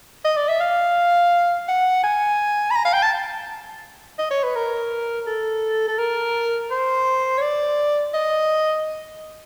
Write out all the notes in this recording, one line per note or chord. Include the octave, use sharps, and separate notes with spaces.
D#5
D5
E5
F5
F#5
G#5
B5
A#5
F5
G5
A5
D#5
C#5
B4
A#4
A4
A4
A#4
C5
C#5
D5
D#5